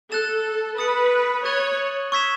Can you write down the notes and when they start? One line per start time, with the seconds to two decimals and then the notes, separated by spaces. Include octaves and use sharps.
0.11 A4 F#6 A6 E7
0.78 B4 D#6 A6 C#7
1.45 C#5 C#6 F#6 A6 D#7 F#7
2.12 C#6 E6 G#6 B6 E7